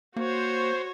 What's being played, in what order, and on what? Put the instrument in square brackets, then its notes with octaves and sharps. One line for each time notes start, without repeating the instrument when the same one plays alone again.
[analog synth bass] A#3 [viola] F#4 C#5 [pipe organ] C5